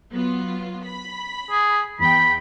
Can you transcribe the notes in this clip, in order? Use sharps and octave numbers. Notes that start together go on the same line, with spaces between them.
F#3 B3 F4
B5
G#4
E2 G5 B5